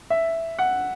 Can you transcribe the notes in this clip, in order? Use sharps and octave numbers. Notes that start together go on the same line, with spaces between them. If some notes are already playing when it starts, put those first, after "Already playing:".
E5
F#5